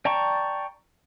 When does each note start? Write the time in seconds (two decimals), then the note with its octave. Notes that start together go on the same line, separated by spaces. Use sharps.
0.05 D5 G5 A5 A#5 C#6